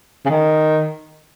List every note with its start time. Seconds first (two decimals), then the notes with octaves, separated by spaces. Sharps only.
0.26 C#3
0.30 D#3